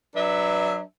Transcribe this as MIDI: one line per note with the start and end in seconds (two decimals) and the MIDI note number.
0.16 0.81 54
0.16 0.81 62
0.16 0.81 71
0.16 0.81 76